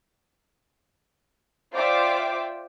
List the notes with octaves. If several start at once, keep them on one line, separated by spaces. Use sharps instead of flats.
F4 C5 D5 E5 G5 D6